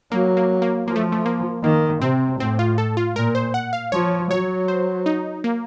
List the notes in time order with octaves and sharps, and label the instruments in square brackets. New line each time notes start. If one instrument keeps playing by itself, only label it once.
[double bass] F#3 [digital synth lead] A#3
[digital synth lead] A#3
A#3
[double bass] F3 [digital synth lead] A#3
[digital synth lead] A3
A3
A#3
[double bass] D#3 [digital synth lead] A#3
[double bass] C3 [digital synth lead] C4
[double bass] A2 [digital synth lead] C4
[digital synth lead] F4
A4
F4
[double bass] A#2 [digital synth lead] A#4
[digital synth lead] C5
F#5
F5
[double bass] F3 [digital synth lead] C#5
[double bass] F#3 [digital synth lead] C#5
[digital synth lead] C5
D#4
A#3